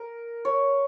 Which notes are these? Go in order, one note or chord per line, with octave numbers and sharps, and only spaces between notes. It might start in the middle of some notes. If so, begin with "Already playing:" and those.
Already playing: A#4
C#5